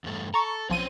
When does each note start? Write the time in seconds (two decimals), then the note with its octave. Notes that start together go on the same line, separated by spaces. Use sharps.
0.04 E2 G2 A3
0.34 A4 A#5 C#6
0.70 B1 F3 C4 C#4 C5 D#7